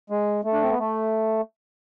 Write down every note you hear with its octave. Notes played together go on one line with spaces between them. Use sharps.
G#3
A3
D4
C4
B3
A3